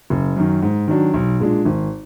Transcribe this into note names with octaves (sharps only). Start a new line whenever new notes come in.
F#1
F#2 D#3
G#2
D#3 F#3 D4
B1
A#2 G#3 D4
G#1